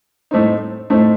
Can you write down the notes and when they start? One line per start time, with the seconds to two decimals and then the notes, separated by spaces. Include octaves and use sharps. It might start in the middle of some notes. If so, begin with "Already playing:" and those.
0.31 A2 A3 C4 D#4
0.90 A2 A3 C4 D#4